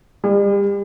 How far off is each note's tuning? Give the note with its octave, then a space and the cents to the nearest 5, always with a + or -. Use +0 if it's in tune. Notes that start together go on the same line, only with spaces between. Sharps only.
G3 +40